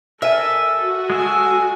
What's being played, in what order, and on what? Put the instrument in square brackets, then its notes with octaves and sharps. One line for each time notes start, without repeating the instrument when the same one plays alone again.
[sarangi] A4 [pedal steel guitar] A#4 G#5 [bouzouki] E5
[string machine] F#4
[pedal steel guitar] G#3 A4 E6 [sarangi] G#5